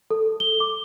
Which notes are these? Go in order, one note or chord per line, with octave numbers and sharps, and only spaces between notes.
A4
G7
D6